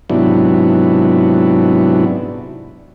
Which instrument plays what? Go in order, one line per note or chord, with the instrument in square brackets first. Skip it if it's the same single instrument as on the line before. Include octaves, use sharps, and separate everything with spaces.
[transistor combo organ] G#2 C3 F#3 B3 D4 E4